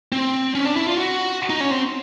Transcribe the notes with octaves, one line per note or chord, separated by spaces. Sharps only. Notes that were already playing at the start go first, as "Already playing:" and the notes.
C4
C#4
D4
E4
F4
F#4
D#4
C#4
C4